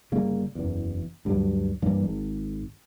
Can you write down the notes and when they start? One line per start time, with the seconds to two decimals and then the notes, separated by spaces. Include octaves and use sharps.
0.12 G1 C#3 G3 A#3
0.55 F#1 E2
1.25 D2 G2 F#3 G3
1.82 G2 E3 G3 A#3
2.04 G#1